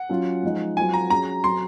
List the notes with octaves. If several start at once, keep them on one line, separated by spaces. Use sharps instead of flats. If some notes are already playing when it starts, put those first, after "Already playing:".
Already playing: F#5
F#3 C#4 F4
F3 G#3 D#4
F#3 C4 F4 G#5
A#5
F#3 C#4 G#4 A#5
F#3 C4 F#4 C6